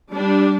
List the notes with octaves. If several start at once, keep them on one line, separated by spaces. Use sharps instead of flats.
G3 D4